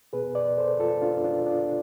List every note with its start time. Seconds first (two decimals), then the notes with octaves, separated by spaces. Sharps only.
0.13 B2 B3 G#4 B4
0.35 B4 D5
0.58 A4 C5
0.79 F4 A4
1.02 D4 F4
1.24 D4 F4
1.47 D4 F4